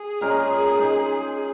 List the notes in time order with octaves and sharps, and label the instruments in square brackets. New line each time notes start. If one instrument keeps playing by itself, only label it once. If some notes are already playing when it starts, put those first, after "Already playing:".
Already playing: [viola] G#4
[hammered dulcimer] A#2 G#3 C#4 A#4
G#3 D#4